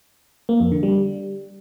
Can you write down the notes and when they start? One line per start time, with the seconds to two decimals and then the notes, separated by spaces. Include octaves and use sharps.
0.49 A#3
0.60 F2
0.72 D3
0.83 G3